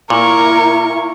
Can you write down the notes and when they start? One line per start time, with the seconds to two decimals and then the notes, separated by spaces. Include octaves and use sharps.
0.10 A#2 E4 A#4 C#6